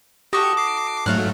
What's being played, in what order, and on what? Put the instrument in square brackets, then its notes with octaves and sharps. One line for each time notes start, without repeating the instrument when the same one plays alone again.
[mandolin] D#4 F#4 A4 [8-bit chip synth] G4 C#6
[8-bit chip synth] D6 C7
[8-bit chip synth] G#2 F#3 A3 [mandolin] F5 F#5